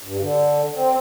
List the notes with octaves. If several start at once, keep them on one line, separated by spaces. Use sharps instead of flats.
G2
D3
C4